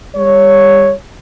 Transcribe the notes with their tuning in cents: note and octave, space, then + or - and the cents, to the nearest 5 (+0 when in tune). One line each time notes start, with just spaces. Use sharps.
G3 +30 C#5 +0